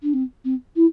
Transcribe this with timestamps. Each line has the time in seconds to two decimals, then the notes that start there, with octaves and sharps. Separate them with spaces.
0.03 D4
0.13 C4
0.45 C4
0.76 E4